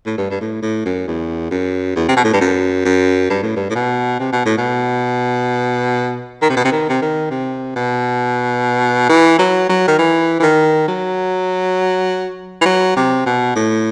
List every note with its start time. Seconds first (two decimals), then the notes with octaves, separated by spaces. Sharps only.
0.06 A2
0.18 G2
0.31 G2
0.41 A2
0.62 A2
0.85 F#2
1.07 E2
1.51 F#2
1.96 E2
2.08 C3
2.17 B2
2.24 A2
2.33 G2
2.41 F#2
2.85 F#2
3.30 G2
3.43 A2
3.56 G2
3.70 A2
3.75 B2
4.20 C3
4.33 B2
4.46 A2
4.58 B2
6.42 D#3
6.49 C3
6.56 B2
6.65 C3
6.72 D#3
6.89 C3
7.02 D#3
7.31 C3
7.76 B2
9.10 E3
9.39 F#3
9.69 F#3
9.88 D#3
9.99 E3
10.40 E3
10.43 D#3
10.88 F#3
12.61 E3
12.65 F#3
12.96 C3
13.26 B2
13.56 A2